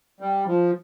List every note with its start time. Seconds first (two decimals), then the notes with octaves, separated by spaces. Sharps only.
0.20 G3
0.47 F3